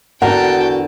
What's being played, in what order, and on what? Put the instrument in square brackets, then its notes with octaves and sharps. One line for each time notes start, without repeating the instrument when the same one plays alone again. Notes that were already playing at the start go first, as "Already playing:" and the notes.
[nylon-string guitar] E2 D3 A#4 [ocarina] F#4 [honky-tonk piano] F#5 [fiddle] G5 A5